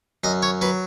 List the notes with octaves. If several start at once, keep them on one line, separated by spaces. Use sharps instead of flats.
F#2 D#5
C#5
F#3 B4